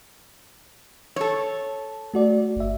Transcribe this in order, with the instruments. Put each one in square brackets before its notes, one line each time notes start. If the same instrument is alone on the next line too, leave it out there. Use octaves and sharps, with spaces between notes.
[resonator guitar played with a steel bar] A4 C#5
[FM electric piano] A3 F#4 D5
G1 E5